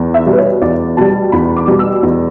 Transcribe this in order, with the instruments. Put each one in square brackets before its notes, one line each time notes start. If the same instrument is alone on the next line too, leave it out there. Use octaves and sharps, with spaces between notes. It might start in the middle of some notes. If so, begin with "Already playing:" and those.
Already playing: [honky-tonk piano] E2
E5
B2 G3
B4
C#5
E2 D5
B2 G3 A5
E2 B5
D6
B2 G3
E6
E2